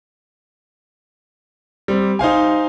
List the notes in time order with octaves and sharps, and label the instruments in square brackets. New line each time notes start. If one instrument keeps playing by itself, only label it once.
[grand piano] G3 C4
D#4 C5 F5 G#5